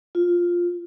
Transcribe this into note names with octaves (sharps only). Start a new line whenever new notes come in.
F4